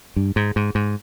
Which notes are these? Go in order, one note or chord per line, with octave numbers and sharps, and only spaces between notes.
G2
G#2
G#2
G#2